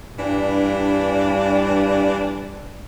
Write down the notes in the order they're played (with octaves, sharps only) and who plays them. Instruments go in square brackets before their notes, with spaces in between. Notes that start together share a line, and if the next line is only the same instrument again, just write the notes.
[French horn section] G2 [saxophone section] E3 G3 D4